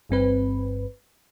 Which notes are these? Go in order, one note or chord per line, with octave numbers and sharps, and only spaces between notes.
G1 G2 C4 B4